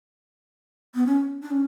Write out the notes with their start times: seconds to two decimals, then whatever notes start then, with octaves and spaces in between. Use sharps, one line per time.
0.95 B3
1.06 C#4
1.42 D4
1.51 C#4